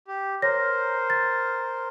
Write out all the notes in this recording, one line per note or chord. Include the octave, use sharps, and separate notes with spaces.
G4
A#4 C5 C#5 A#6
A6